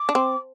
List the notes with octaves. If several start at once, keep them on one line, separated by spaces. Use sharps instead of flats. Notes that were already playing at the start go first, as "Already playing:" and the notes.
Already playing: D6
D4
C4